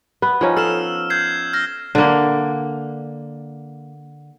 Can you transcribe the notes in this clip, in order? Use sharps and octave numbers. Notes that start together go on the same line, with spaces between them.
B3 B4
F3 C#4 D#4
A4 F5 E6 F6 E7
G6 G#6 C7
F6 A#6
D3 A#3